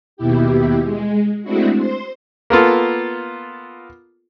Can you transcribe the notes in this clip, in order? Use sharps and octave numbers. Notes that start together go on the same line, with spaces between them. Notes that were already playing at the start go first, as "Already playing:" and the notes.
D#2 B2 E4 G4
G#3
G#3 A3 C4 D4 E4 F#4
C5 C6
A#3 B3 F4 A4